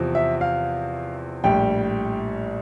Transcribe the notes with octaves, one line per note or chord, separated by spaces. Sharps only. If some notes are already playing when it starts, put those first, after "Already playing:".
Already playing: E2 C3 F3 C4
E5
F5
A#1 A2 G3 G5